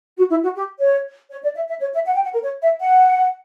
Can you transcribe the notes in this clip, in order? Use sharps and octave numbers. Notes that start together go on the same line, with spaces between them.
F#4
E4
F#4
G4
C#5
C#5
D5
E5
E5
C#5
E5
F#5
G5
F#5
A#4
C#5
E5
F#5